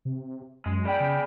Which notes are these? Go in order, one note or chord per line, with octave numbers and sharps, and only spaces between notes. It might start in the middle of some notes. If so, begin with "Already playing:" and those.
C3
F#2 G#3
G#4 D5 G5 B5
C#3